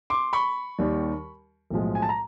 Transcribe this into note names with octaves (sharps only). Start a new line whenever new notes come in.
C6 D6
B5 C#6
D#2 D#3 G3
B1 A2 F3 G#3
G#5
A5
A#5